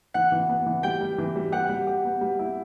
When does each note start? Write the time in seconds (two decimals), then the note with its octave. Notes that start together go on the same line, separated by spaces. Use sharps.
0.14 E3 F#5
0.32 E3
0.49 B3
0.66 E3
0.83 G3 G5
1.01 G3
1.18 E3
1.36 G3
1.52 G4 F#5
1.69 G3
1.87 G4
2.05 B3
2.21 G3
2.39 E4